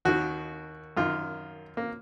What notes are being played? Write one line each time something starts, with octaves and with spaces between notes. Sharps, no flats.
D#2 D#3 F#4
F#2 D#3 F4
A#3